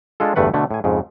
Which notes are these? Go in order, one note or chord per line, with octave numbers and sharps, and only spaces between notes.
G#3 D4 F4 A4
G1 E2 G2 A3 B4 F#5
B2 D3 A3
A2 G#5
F2 G#2 C#3